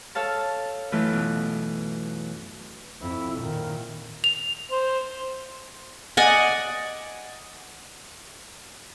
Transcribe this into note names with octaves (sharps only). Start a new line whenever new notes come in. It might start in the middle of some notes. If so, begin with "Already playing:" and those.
A4 C#5 F5 A5
F#2 E3 A3 F4
B2
F2 E4
A#2 D#3
F7
C5
D5 D#5 F#5 G#5